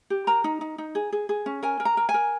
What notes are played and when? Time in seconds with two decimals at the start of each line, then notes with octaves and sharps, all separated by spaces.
0.10 G4
0.27 A#4 A#5
0.44 D#4
0.61 D#4
0.78 D#4
0.95 G#4
1.12 G#4
1.29 G#4
1.46 C#4
1.63 A#4 G#5
1.80 A#4
1.85 A#5
1.97 A#4
2.09 G#5
2.14 A#4